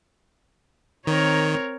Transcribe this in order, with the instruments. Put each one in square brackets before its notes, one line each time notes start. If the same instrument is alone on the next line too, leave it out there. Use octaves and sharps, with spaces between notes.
[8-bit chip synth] D#3 [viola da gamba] C4 A#4 C#5